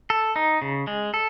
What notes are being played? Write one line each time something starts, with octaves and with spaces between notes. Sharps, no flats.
A4
D#4
C#3
G#3
A4